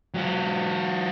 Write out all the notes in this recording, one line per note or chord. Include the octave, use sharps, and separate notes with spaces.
F#3 F4